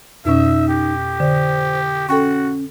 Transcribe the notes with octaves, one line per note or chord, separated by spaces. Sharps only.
F2 B2 C#4 D#4 E5
G4
D3 C5
C#4 F#4 A4 G5 C#6